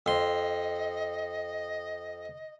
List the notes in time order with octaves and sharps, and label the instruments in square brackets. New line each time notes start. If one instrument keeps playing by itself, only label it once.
[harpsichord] F2 C6 [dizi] D#5